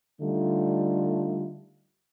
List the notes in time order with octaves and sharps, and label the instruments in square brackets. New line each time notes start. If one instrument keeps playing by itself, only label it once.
[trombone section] D3 G3 A3 D#4 F4